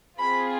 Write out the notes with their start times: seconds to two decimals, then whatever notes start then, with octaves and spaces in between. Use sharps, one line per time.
0.18 C4 F4 G#4 B5